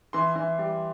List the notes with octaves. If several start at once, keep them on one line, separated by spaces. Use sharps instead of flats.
E3 C6
E3
G3